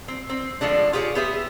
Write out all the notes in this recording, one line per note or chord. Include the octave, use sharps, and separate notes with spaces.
C4
C4
D3 F3 G#3 A3 D4
F4 G4 G#4 B4 C#5
B3 G4 G#4 B4 E5